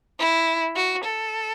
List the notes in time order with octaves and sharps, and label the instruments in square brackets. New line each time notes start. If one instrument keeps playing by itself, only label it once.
[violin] E4
F#4
A4